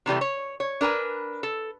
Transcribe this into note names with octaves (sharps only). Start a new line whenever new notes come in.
C3 E3 G3 A3
C#5
C#5
D4 A#4 B4 G#5
A4